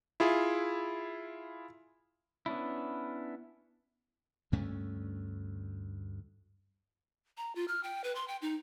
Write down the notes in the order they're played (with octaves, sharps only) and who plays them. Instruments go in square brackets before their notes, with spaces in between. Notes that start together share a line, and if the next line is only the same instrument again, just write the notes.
[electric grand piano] E4 F4 G#4
[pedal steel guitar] B3 C#4 D4 E4
[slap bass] D2 G2 A3 C#4
[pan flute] A#5
F4
F6
G5
B4
C6
G5
D#4